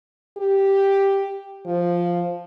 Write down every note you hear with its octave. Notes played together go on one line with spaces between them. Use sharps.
G4
F3